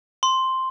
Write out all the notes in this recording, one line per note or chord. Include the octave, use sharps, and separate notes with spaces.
C6